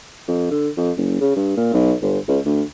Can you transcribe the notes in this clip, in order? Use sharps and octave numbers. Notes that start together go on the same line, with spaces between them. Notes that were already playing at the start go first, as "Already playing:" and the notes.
F2
D3
F2
F#1
C#3
G2
A#2
B1
G1
C#2
D2